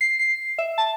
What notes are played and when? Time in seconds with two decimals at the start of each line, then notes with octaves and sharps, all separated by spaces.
0.01 C7
0.19 C7
0.58 E5
0.78 A5